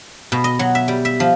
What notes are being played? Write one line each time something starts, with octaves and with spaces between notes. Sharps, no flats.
B2
D#5
F#3
E5
G3
E5
F3